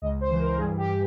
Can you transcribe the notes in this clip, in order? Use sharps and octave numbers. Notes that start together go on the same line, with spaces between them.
C#2 D#5
C5
E3
A#4
G2 G#4
G4